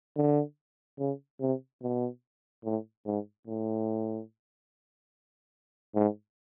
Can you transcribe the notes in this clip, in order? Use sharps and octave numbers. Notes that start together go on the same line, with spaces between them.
D3
C#3
C3
B2
A2
G#2
A2
G#2